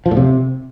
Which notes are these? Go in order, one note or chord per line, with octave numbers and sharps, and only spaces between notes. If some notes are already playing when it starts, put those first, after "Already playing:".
F3
A2
C3